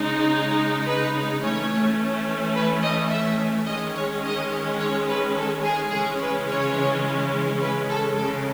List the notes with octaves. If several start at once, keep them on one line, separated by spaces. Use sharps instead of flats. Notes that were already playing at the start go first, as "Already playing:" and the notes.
Already playing: C#3 G#3 D#4
B4
E3 A3 C#4 C#5
B4
D#5
E5
D#3 G#3 C#4 D#5
C#5
D#5
C#5
B4
A4
G#4
C#3 E3 G#3 C#4 G#4
B4
C#5
B4
A4
C#3 G#3 C#4 A4